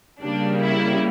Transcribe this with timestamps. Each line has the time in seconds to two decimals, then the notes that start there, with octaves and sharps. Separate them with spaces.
0.21 C#3 G3 A#3 D4
0.61 E4